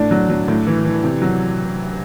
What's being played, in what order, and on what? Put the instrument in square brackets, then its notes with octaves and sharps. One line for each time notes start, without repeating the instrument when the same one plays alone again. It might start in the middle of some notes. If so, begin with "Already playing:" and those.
Already playing: [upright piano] A2 D4
F#3
F#3
A2
E3
E3
C3
F#3